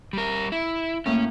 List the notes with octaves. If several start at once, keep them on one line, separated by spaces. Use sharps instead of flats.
G3 A#4
E4
A2 A#3 C#4